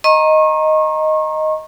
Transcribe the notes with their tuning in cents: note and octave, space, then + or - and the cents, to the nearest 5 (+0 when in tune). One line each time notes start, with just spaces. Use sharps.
D#5 +0 A#5 +0 C#6 -40